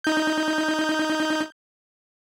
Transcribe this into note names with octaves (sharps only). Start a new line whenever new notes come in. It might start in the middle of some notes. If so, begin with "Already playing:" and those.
D#4 G6